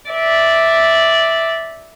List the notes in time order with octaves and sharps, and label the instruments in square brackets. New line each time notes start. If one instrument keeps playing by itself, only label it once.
[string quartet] D5 E5